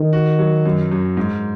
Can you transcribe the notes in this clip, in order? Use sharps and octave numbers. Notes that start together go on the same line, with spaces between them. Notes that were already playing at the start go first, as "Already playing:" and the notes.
Already playing: D#3
F#4
F#3
F#2
F#2
G#2